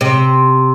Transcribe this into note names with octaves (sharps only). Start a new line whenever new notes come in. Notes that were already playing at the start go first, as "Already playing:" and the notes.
C3